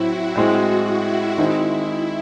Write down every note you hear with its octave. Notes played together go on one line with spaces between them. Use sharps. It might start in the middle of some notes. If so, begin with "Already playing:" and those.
Already playing: A2 F#3 C4 E4 F#4
A2 G#3 C4 F#4
E4
D#3 G#3 C4 D#4 E4